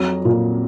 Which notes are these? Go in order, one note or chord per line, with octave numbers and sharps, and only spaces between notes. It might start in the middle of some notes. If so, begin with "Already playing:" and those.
Already playing: F2 F#3 A#5
A#2